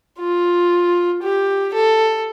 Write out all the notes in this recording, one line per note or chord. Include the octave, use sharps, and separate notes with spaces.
F4
G4
A4